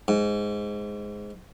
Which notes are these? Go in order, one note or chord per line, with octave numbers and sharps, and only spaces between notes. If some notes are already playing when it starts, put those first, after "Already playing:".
G#2